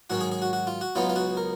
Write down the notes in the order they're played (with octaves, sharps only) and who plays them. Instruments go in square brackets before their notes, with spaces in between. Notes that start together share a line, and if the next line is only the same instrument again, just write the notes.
[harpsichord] G#2 D#3 F#3 C#4 F#4
G#4
G#4
F#4
F#4
F4
F#4
C#2 C#3 F#3 B3 D#4 F4
F4
F#4
A#4